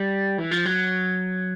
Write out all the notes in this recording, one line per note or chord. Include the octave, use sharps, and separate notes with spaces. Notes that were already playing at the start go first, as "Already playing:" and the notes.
Already playing: G3
E3
F3
F#3